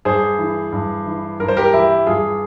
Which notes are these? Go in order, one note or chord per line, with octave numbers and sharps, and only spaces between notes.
G2 G#4 C5
E3
G2
E3
G2 A#4
C5
G4 A#4
E3 E4 G4
G2 F4 G#4